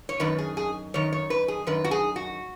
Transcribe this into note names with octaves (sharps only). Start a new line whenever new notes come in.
C#5
F#2 D#3 B4
G#4
G#4
F#2 D#3 C#5
C#5
B4
G#4
F#2 D#3 B4
F#4
G#4
F#4